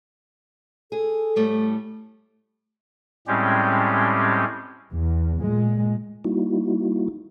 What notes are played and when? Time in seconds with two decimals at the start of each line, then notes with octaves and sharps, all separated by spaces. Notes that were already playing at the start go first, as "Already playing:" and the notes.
0.92 G#4 A4
1.36 A2 G3 A3
3.27 A2 G3 G#3 C4 C#4 G4
4.91 E2
5.41 A#2 G#3
6.24 G3 A#3 D#4 E4 F#4